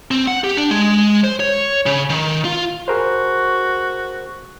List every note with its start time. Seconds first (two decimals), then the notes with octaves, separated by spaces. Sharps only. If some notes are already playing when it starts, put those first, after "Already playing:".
0.11 C4
0.27 F#5
0.44 G4
0.57 D4
0.71 G#3
1.24 C5
1.40 C#5
1.86 C#3
2.10 D#3
2.45 F4
2.88 F#4 G#4 A#4 C5